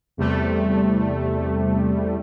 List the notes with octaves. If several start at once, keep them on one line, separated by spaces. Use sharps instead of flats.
E2 C3 G3 A3